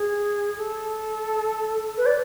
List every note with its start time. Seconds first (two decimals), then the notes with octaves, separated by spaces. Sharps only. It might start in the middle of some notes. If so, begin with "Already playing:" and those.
Already playing: G#4
0.57 A4
1.98 B4
2.06 D5